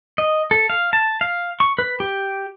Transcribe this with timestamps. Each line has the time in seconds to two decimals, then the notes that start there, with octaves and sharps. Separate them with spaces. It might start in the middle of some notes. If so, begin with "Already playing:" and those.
0.18 D#5
0.51 A4
0.70 F5
0.93 A5
1.21 F5
1.60 C#6
1.79 B4
2.00 G4